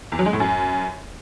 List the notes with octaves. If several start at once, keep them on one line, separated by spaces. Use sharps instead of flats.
E2
F#3
G#3
A2
F#2